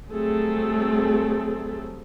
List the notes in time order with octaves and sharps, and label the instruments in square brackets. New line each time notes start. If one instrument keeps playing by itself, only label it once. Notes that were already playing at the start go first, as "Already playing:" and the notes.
[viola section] F#3 G3 A3 C4 G#4 A4